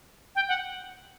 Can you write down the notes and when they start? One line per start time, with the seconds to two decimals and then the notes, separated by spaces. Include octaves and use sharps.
0.36 G5
0.49 F#5